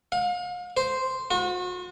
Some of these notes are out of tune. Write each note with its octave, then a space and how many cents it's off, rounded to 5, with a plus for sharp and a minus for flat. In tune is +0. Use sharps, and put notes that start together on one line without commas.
F5 +40
C5 -5
F#4 -40